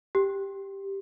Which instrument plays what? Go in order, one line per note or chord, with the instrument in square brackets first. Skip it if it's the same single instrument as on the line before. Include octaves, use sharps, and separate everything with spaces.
[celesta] G4